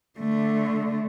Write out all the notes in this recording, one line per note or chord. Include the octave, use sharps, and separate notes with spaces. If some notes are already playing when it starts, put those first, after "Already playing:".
D3 A3